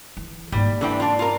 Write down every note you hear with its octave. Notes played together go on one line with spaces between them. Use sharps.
E3
G#2 G3 A#3
D3 E3 G5
D4 F4
F4 A#4